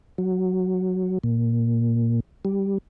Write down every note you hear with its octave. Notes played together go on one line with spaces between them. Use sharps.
F#3
A#2
G3